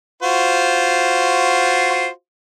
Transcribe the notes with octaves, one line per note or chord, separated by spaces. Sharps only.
F4 F#4 C5